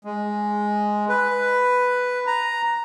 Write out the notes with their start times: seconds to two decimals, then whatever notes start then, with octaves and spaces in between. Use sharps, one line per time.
0.04 G#3
1.09 B4
2.27 A#5